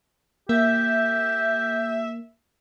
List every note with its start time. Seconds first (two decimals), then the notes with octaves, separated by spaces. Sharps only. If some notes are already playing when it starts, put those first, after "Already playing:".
0.49 A#3 G4 E5